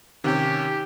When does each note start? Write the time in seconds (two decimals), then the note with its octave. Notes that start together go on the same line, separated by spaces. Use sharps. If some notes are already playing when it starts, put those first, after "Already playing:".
0.24 C3 D#3 C#4 G4